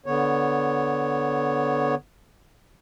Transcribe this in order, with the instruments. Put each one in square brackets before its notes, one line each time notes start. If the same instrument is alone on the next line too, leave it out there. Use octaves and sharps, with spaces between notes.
[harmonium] D3 B3 C#5